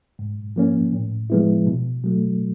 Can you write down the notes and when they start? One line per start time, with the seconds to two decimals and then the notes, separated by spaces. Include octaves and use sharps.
0.19 G#2
0.56 F3 A#3 C#4
0.93 A2
1.30 F3 G#3 B3 E4
1.67 B2
2.04 F#3 A3